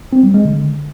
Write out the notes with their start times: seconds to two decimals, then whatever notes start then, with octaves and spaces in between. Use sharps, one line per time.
0.13 C4
0.23 G3
0.34 G#3
0.45 D3